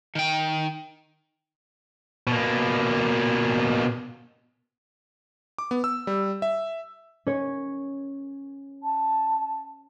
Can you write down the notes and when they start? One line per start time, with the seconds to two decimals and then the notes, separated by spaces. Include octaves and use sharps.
0.15 D#3 G5
2.27 B2 A#3
5.58 D6
5.71 B3
5.84 E6
6.07 G3
6.42 E5
7.27 C#4 C#5
8.83 A5